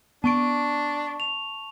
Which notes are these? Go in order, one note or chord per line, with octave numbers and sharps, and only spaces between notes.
B3 D4 A5 C#6 D7
F7